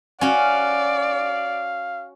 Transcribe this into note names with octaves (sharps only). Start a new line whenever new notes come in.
C#4 F#4 D5 F5